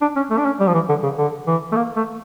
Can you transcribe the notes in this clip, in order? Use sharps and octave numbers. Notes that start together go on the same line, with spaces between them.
D4
C#4
A3
D4
C#4
G3
F3
E3
D3
C#3
D3
E3
A3
A#3
A3